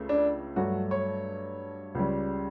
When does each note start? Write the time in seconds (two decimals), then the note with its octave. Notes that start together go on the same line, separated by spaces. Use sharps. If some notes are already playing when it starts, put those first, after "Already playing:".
Already playing: C#2 C#3 A3
0.09 D4
0.56 G2 F#3 A3 F#4
0.91 C#5
1.95 C#2 C#3 G3